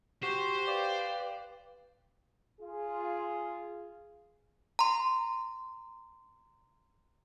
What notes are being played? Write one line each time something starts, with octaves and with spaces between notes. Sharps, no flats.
F#4 G4 C5
B4 D5 F5 G5
F4 G#4
A#5 C6